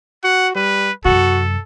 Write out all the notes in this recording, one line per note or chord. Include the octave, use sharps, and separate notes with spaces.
F#4 F#5
G3 B4
F#2 C3 F#4 A4